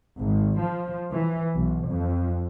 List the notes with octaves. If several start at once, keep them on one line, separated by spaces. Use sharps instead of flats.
G#1
F3
E3
B1
F2